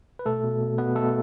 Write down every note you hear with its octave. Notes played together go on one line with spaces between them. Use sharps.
B4
B2 A3 A4
B2
B2
B2 B3 B4
B2 A3 A4